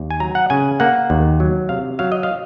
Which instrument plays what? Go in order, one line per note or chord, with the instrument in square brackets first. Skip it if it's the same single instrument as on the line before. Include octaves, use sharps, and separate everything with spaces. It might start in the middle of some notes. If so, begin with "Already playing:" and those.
Already playing: [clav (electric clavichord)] D#2
G#5
F#3 A#5
F#5
C#3 G#5
A#3 F#5
D#2
F#3
C3 F5
F#3 F5
D#5
F5